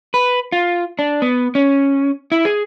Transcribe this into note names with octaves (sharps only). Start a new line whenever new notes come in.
B4
F4
D4
B3
C#4
E4
G#4